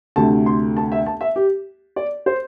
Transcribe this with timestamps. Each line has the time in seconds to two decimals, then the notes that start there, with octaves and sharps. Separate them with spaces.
0.16 D2 C3 A3 A5
0.46 C6
0.77 A5
0.92 E5
1.06 A5
1.21 E5
1.36 G4
1.96 D5
2.26 C5